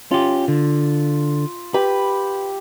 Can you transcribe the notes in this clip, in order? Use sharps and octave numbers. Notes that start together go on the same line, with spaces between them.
C#4 F4 G4
D3
G4 B4 B5